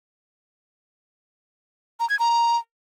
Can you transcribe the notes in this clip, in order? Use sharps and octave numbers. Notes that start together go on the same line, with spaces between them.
A#5
G#6
A#5